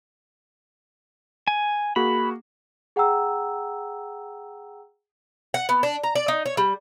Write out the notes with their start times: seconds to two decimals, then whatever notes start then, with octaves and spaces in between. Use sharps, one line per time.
1.48 G#5
1.96 A#3 F#4 G#4 B5
2.96 G#4 F#5 G5 A#5 E6
5.54 F#5
5.69 B3
5.83 D4
6.03 A#5
6.15 D5
6.28 D#4
6.46 C#5
6.57 G3